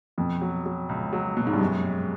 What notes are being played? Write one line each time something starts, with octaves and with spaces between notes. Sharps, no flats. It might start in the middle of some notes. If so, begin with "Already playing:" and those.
F2 B2
F#3
F#3
C#2
F#3
B2
G#2
G2
F#2 G#3
G#3